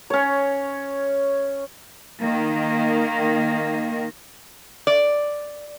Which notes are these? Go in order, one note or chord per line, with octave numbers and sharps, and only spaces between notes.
C#4 C#5
D#3 A#3
D5